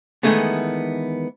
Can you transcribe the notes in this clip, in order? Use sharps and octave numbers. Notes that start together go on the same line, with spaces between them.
D#3 E3 G#3 A3 B3